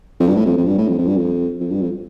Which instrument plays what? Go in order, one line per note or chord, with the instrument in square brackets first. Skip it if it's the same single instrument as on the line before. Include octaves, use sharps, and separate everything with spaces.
[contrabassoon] F2
G2
A2
F2
F2
G2
A2
F2
F2
G2
F2
F2
G2
F2